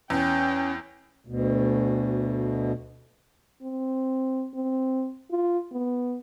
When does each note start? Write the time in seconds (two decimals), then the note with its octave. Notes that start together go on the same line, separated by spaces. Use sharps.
0.10 E2 C#4 G5
1.27 D2 B2
3.62 C4
4.55 C4
5.31 F4
5.72 B3